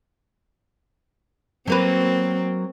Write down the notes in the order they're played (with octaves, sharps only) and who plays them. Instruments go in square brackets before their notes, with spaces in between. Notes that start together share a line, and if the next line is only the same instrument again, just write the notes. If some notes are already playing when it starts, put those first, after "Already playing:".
[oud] F#3 A#3 B4 [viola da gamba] C4